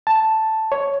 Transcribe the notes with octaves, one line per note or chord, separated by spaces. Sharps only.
A5
C#5